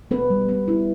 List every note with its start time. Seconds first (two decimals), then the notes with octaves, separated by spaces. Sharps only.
0.11 B3 B4
0.30 G3
0.49 B3
0.68 E4